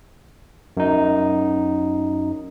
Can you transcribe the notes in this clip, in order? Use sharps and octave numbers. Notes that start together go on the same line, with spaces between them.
F#2 D#4